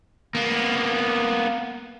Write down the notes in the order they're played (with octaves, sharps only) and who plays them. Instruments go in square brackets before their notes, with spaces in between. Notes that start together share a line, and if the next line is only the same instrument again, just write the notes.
[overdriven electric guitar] A#3 B3